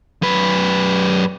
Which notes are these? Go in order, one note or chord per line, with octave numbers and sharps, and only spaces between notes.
F#2 B4